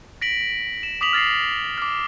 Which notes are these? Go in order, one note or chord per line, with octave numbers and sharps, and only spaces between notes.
A#6 B6 D7 F#7
E7
D6 D#6 B6 F7 F#7
F6 A6 A#6 C7
D6 F6